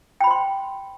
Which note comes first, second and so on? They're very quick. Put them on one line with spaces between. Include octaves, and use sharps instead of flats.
G5 B5 C5 C6